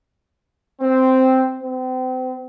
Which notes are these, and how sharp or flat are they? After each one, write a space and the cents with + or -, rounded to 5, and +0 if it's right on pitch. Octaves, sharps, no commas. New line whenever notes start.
C4 -5
C4 -35